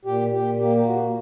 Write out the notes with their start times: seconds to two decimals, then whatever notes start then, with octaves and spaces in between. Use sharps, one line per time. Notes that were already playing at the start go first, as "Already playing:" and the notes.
0.05 A#2 G4
0.32 A#2 G4
0.59 A#3 G4
0.77 G4
0.85 A#2 F#4